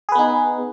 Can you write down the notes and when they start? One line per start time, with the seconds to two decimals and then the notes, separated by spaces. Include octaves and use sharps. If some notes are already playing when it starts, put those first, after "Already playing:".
0.09 G#4
0.12 B4
0.15 B3
0.19 D#4